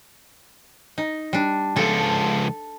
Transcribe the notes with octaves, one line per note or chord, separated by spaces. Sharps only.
D#4
G3 D4
C#2 F3 A4